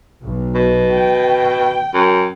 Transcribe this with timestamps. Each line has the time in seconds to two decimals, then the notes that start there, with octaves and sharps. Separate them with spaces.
0.23 B1
0.55 B2
0.92 G5
1.94 F#2